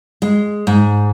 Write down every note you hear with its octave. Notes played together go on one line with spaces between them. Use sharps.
G#3
G#2